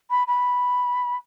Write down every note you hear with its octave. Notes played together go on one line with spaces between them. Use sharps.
B5
B5